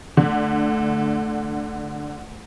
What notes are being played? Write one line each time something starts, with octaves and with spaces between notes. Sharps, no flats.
D3 A3